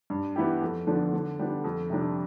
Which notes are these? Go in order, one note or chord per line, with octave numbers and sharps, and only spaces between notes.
G2
E3 B3 E4 G4
F2
D3 F3 B3 D4
D3
G3 B3 D4
F2
C3 G3 D4